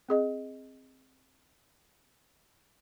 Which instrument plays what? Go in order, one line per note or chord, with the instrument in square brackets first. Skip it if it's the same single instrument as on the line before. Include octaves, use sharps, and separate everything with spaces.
[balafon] C4 G#4 D#5